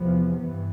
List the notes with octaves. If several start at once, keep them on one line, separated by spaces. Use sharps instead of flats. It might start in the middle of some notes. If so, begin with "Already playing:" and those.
Already playing: E2 C3 F3 B3
G2 E3 B3